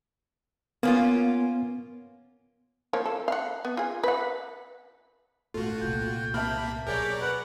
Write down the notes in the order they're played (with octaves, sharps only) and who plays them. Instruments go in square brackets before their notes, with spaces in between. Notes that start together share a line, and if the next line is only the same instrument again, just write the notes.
[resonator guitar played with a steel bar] A#3 C#4 F4 [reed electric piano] B3
[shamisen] F3 A#3 C#5
A4
F5 F#5
B3
F4 G#4
B4 F#5
[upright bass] A#1 G#2 [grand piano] A3 [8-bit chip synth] F4 F#4
[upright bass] C2 A#2 [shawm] G5
[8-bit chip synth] C3 A#3 B5 [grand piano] E5 A5 F6
[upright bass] B2 F#3 [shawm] G4 [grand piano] G#4 [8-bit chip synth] A#4 C#5 D5
[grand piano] B4 [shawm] F#5